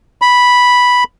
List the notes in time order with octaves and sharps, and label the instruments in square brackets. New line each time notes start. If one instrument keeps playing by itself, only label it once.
[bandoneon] B5